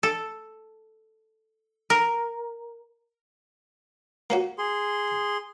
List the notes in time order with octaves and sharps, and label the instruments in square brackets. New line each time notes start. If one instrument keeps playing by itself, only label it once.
[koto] A4
A#4
[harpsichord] A#3 C#4 F#4
[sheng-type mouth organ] G#4 C6